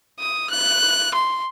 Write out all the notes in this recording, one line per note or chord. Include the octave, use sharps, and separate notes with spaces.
D#6
F#6
C6